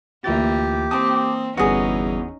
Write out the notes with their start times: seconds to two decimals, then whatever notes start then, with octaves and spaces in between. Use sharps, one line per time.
0.24 D2 E3 A#3 F4 G4 A6
0.91 A#3 C4 A5 D6 D#6
1.57 G1 E2 G3 C#4 D#4 F#4 G#4 B4